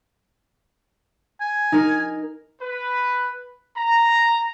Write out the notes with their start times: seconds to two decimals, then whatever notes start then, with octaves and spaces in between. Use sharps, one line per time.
1.41 G#5
1.72 D#4 A#4
2.62 B4
3.77 A#5